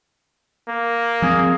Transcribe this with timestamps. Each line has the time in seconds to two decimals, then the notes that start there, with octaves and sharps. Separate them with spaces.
0.68 A#3
1.22 F3 C4 G#4